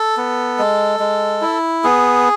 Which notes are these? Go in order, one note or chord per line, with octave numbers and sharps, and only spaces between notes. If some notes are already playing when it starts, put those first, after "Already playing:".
Already playing: A4
B3
G#3
G#3
E4
B3 G#4